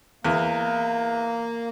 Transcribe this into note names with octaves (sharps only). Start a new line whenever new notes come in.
E2 A#3